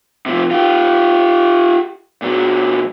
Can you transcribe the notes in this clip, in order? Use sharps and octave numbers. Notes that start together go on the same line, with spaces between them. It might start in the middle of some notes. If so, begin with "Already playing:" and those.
C3 F3
F4 G4
A#2 F#3